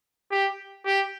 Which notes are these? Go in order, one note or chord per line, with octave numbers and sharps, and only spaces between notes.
G4
G4